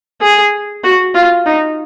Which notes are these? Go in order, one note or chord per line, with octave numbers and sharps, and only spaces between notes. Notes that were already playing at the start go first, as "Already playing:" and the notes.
G#4
F#4
F4
D#4